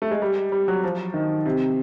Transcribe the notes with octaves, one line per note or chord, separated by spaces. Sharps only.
A3
G#3
G3
G3
F#3
F3
D#3
C3